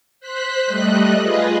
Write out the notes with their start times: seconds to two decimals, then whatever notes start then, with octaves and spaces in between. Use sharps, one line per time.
0.20 C5 F#6 B6
0.65 G3 A3 D#5 F#6
1.21 F4 G#4 B4 D#5